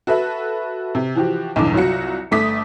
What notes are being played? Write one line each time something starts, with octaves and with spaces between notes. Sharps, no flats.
F#4 A4 B4 E5
C3
E3 F3 F#4 G4
B1 E2 G2 D3 E3 D6
C2 F#3 F4 F#4 C#7
G1 A3 D6 D#6 B6